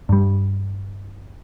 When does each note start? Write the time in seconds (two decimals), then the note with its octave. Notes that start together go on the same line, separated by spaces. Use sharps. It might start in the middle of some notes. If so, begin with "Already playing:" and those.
0.09 G2 G3